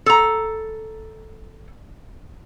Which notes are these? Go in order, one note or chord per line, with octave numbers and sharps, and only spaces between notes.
A4 A#5